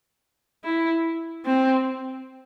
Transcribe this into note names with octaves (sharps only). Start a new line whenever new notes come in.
E4
C4